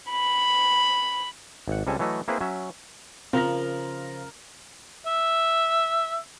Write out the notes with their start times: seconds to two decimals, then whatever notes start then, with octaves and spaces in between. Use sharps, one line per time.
0.11 B5
1.68 G#1 F#5
1.87 C#2 G3 C4 A4 G#5 A5
1.99 E3 F#3 A3 A4 D#5
2.28 A#3 C4 E4 G#4 B4 C5
2.41 F#3 C#4 E5
3.33 C#3 F3 C4 F4 A#4 A#6
5.06 E5